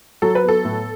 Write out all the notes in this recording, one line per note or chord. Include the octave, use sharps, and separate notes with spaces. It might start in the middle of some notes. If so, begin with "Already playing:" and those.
F#3 A4
B4
B3
A4
A2